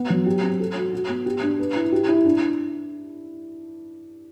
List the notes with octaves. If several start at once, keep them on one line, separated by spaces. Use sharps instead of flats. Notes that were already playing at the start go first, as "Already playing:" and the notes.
Already playing: B3
F#3
G4
C4
A4
F#4
F#4
B3
G4
D4
B4
E4
G4
E4
D4